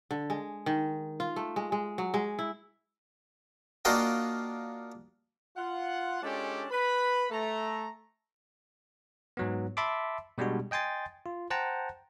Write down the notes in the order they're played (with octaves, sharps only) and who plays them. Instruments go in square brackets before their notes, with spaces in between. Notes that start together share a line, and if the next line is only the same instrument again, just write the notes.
[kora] D3
G#3
D#3
F4
A3
G#3
G#3
F#3
G#3
E4
[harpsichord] A#3 D4 F4 F#4 D#5 G5
[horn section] F4 F#5
G#3 C#4 D4 F4 G4 A4
B4 B5
A3 A4 A#5
[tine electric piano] G#2 F#3 B3
E5 A5 B5 C6 D6
B2 G3 G#3 D4 F#4
D#5 G5 G#5 C6 A6
F4
C5 F#5 G5 A5 A#5